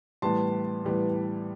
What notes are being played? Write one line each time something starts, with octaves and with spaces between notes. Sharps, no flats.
A2 E3 G3 B3 A5 C6
A2 E3 G3 B3